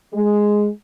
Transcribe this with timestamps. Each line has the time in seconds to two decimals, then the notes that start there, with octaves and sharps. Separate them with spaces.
0.13 G#3